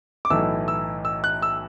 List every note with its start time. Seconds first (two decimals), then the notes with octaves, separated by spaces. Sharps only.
0.25 D6
0.30 B1 A2 E3 A3 E6
0.68 E6
1.05 E6
1.24 F#6
1.42 E6